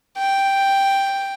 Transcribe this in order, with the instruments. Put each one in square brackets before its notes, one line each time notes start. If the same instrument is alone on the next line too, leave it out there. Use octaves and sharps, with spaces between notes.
[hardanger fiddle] G5